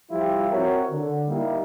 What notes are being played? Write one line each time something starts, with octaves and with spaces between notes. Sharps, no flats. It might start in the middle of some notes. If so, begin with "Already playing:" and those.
F3 G3 E4 F4 G4
C4 E4 F#4 A#4 C#5
D3
G3 A#3 D#4 E4 G4